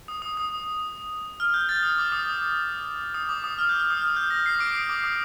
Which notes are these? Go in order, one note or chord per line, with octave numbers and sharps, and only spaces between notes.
D#6
D#6
D#6
F6
G6
A6
D#6
D6
D#6
D#6
D6
D#6
F6
G6
F6
D#6
F6
G6
A#6
C7
D6 D7
D#6
D6
D#6